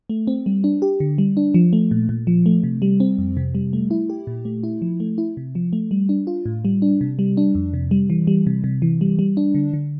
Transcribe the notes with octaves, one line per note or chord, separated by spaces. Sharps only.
A3
C4
G3
D4
G4
D3
G3
D4
F3
A3
A#2
A#2
F3
A3
C3
G3
C4
F2
C3
G3
A3
E4
G4
A#2
A3
E4
F3
A3
E4
C3
F3
A3
G3
D4
F4
A2
G3
D4
C3
G3
D4
F2
C3
G3
E3
G3
C3
C3
E3
G3
G3
D4
D3
D3